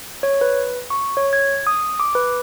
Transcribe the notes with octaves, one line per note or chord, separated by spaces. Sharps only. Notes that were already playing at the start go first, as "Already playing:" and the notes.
C#5
B4
C#6
C#5
G#6
D#6
D6
B4